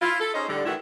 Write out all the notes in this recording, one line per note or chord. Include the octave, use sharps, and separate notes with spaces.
E4 F4
A4
C#4 D#4 G#4 C5 D#5
A2 D3 G3
A2 D#3 E3 A3 E4 F#4